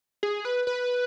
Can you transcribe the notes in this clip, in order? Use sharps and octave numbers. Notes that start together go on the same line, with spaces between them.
G#4
B4
B4